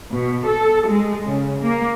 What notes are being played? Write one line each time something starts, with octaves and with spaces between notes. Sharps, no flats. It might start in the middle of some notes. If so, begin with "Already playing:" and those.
B2
A4
G#3
C#3
A#3